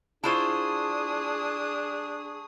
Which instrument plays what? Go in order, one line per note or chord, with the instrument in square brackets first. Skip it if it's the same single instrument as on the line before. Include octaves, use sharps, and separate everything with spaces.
[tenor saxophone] D4 [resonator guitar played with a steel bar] E4 F4 C5 [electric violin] G#4 D#6 [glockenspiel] A5 C#6